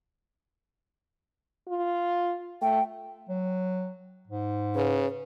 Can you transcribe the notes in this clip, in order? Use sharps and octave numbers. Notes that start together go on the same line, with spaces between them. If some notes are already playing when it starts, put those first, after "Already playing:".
F4
A3 G5
F#3
G#2
C#3 B4